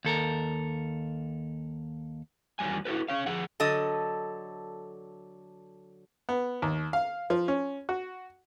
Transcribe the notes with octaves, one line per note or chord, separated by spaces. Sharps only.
D#2 A4 A#4
E2 D#3 F#3 G3 G#5
E4 F#4 A4 B4
C#4 C#5 F5
F3 G#4 F#5
D3 F#3 A4 D#5
B3
D#2
F5
F3
C#4
F#4